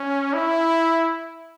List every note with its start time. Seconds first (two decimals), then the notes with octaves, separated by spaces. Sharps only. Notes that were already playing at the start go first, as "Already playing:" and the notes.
Already playing: C#4
0.34 E4